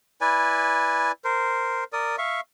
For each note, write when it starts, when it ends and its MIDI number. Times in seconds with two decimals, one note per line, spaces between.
0.21 1.12 64
0.21 1.12 71
0.21 1.12 74
0.21 1.12 80
1.24 1.84 70
1.24 1.84 72
1.93 2.16 70
1.93 2.16 74
1.93 2.16 87
2.18 2.40 76
2.18 2.40 77
2.18 2.40 85